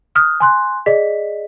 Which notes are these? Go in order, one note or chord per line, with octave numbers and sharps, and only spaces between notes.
D#6 F6 F#6
G#5 C6 F#6
G#4 D5 D#5 B6